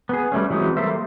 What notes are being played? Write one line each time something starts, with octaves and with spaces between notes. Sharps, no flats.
B3 G#4
G3 A3 C#4
E3 F#3 G#3 C4 D#6
G3 A#3 A4 C5 E5